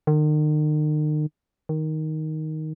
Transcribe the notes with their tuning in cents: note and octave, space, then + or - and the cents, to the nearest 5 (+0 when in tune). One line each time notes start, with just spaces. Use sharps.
D#3 -40
D#3 +5